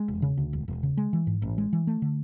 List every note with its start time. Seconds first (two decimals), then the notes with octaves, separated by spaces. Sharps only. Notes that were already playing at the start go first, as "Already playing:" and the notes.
Already playing: G#3
0.08 E1
0.22 C#3
0.37 D2
0.53 E1
0.68 E1
0.83 C#3
0.97 G#3
1.13 E3
1.27 G#2
1.42 A1
1.58 G#3
1.73 E3
1.87 A3
2.02 D3